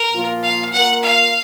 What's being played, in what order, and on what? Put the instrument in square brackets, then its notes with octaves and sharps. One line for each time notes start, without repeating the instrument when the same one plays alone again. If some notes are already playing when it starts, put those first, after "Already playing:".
Already playing: [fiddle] A#4
[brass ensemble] A#2 F3 A#3 F4
[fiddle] F5
[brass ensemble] A#3 F4 A#4 [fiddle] F#5
[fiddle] F5